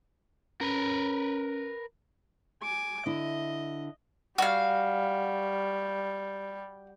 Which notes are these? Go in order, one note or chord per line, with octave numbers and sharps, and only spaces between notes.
C#4 A#4 B4
G#5 D6
D3 D4 E4 D#5
G3 F#4 F5